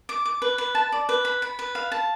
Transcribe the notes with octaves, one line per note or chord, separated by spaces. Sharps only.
D6
D6
B4
B4
A5
D5
B4
B5
B5
B4
F5
A5